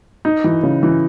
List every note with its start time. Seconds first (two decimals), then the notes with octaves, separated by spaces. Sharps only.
0.25 D#4
0.44 E3
0.63 C#3
0.83 E3